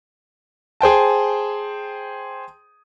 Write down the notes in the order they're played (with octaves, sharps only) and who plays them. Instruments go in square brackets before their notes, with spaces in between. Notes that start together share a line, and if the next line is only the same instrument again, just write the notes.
[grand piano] G#4 C5 G5 A5